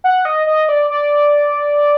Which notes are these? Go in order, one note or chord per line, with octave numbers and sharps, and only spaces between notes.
F#5
D#5
D#5
D5
D5